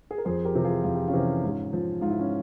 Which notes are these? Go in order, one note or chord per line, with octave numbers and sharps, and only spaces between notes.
G#4
A#4
F2 G#4 C5
G4 A#4
C3 E3
F4 G#4
F2 F4
G4
C#4 F4
C3 E3
G#2
F3
G#2 F4
E4
C#4